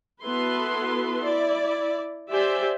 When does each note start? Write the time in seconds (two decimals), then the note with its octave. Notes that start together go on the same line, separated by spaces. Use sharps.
0.23 B3 E4 F#4 A4 B4 C6
1.23 E4 D5
2.30 G4 C5 D5 E5 G#5